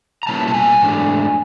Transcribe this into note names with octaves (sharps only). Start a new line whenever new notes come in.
A#5
B2 G3 A#3 C#4 E4 A5
A5
G#5
G#2 E3 A3 D4